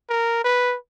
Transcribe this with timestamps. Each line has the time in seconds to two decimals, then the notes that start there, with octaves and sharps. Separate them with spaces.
0.09 A#4
0.44 B4